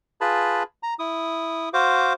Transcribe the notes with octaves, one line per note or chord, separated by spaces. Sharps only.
F4 G#4 B4 A5 B5
A#5
E4 D#6
F#4 C5 F5 D6